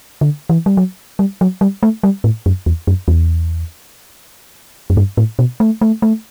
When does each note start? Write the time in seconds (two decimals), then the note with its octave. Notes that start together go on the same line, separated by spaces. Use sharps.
0.21 D3
0.49 E3
0.66 G3
0.77 F#3
1.19 G3
1.41 F#3
1.61 G3
1.83 A3
2.03 G3
2.24 A2
2.46 F#2
2.66 E2
2.87 F#2
3.08 E2
4.90 F#2
4.97 G2
5.17 A2
5.39 B2
5.60 A3
5.81 A3
6.02 A3